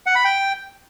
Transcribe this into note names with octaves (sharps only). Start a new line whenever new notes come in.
F#5
B5
G5